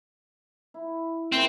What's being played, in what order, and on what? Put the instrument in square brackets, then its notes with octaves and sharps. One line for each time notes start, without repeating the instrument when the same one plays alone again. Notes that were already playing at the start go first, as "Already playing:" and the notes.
[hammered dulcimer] E4
[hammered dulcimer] A#2 C#3 E5 [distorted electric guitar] C4